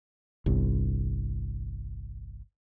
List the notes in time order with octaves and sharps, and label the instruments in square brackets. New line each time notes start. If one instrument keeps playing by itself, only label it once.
[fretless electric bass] G1 C2